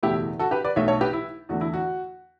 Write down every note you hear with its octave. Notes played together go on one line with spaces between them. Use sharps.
F#1 E2 B2 A3 E4 G4
F#4 A4
G4 B4
B4 D5
B1 B2 A3 C#5 E5
A4 C#5
G4 B4
E4
E2 D3 A3 F#4
E4
F#4